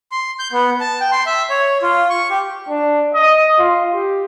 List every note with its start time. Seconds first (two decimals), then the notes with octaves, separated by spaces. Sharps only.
0.12 C6
0.39 G6
0.52 B3
0.80 A5
1.01 G5
1.12 C6
1.26 E5
1.50 C#5
1.82 F4
2.10 C#6
2.30 G4
2.69 D4
3.14 D#5
3.59 F4
3.94 G4